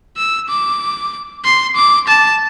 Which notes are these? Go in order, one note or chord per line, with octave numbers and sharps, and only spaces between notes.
E6
D6
C6
D6
A5